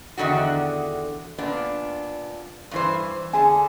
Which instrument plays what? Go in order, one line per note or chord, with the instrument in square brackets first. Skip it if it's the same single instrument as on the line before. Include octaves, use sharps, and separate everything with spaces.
[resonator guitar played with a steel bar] E2 G#2 D3 D#3 F#4
A#2 B3 D4
G2 E3 C5
[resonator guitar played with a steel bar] D3 G#4 A5 [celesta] G#5